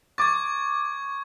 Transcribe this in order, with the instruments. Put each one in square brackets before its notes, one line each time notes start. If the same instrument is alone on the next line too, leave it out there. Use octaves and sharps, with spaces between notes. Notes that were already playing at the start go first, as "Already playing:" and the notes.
[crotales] C#6 G#6 [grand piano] D6 A6